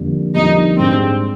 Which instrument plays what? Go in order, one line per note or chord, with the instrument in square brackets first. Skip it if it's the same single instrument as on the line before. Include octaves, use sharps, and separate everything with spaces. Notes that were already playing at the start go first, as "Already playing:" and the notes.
Already playing: [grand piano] F2 D3 G3 A#3
[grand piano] F2 D3 G3 A#3 [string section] D#4
[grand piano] G#2 G3 D4 G#4 [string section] C4